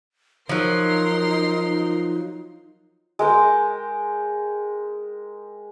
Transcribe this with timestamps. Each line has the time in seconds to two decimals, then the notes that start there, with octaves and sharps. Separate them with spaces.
0.49 F3 F#3 D#4 A#4 C6
3.19 G#3 A#4 G5